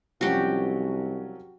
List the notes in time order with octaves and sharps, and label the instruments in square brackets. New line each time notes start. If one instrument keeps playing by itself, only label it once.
[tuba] C2 [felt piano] F3 F#3 C#4 [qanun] F#4 G4